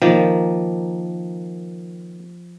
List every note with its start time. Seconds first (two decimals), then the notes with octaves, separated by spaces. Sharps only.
0.02 D#3 F3 A#3